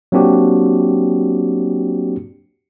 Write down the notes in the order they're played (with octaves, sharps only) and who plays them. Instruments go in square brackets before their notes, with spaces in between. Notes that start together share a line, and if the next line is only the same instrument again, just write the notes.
[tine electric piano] F#3 A#3 C4 D4 F#4 G4